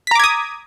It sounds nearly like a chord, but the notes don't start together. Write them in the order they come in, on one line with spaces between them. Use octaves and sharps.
B6 A#5 D6 G#6 D#6